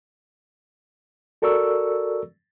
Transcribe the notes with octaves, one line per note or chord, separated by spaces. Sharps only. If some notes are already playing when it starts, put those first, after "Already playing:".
F#4 A4 A#4 D5 C#6 E6